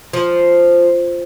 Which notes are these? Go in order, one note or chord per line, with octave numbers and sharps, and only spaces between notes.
F3